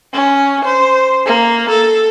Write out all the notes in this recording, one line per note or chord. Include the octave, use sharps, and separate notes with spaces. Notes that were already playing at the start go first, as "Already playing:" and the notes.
C#4
C5
A#3
A4